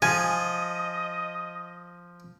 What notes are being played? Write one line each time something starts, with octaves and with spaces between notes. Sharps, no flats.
F3 D#5 G#5